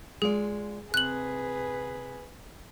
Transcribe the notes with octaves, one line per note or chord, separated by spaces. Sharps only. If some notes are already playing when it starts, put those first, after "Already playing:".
G#3 F4 G#4 D5
C3 G#4 B4 F#6 F#7